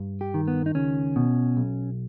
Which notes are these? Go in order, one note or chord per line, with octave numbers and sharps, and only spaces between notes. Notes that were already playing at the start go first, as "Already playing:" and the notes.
Already playing: G2
G4
D#3
B3
D#4
C#2 C#4
B2
B1